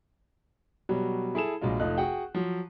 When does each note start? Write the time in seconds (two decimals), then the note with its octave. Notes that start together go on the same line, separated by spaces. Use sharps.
0.89 B2 F#3 G3
1.35 E4 G#4 A4 E7
1.61 A#1 F#3 G#3 F4
1.80 F1 A3 D#4 F4 F#6
1.98 F#4 G#4 F#5 G5
2.35 F3 F#3